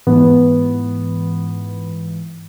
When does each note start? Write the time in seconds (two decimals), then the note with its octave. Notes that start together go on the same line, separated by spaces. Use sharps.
0.07 G#2 E3 B3